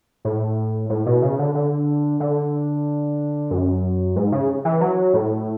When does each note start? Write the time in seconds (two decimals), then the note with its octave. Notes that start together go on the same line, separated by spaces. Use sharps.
0.25 A2
0.90 A2
1.06 B2
1.22 C#3
1.39 D3
1.55 D3
2.20 D3
3.51 F#2
4.16 G#2
4.32 C#3
4.65 E3
4.81 F#3
5.14 A2